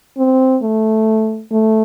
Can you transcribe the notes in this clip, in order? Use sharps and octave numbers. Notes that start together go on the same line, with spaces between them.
C4
A3
A3